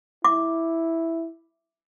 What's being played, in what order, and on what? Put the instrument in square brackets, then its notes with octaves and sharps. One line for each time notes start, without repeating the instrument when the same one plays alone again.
[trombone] E4 [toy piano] D6